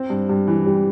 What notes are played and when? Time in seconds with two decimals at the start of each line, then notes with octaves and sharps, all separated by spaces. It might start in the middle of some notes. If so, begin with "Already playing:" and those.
Already playing: C4
0.10 G2
0.29 G2
0.47 E3
0.66 G3